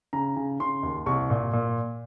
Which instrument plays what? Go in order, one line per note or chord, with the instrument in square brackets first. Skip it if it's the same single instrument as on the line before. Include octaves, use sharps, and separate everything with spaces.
[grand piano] C#3 A#5
C#3
C#3 C6
D#2
C2 C#6
A#2
A#2